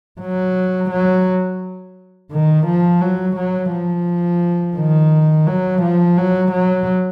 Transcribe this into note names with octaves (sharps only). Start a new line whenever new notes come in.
F#3
F#3
D#3
F3
F#3
F#3
F3
D#3
F#3
F3
F#3
F#3